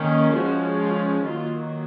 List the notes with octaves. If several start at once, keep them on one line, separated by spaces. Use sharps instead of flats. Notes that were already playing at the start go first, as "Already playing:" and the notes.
Already playing: D#3 A#3 C#4
F3 G#3 C#4 F#4
F4
D#3 F#3 A#3 F4